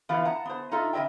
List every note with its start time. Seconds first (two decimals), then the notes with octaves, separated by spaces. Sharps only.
0.09 E3 F3 B3 E4 F4 F5
0.25 F#5 A5 A#5
0.45 B3 C5
0.71 D#4 F4 A4 D#5 E5
0.93 C#3 F3 D#5 E5 G5